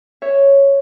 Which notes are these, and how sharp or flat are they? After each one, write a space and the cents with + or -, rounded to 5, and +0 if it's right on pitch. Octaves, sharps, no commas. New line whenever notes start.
C#5 +0 E5 +0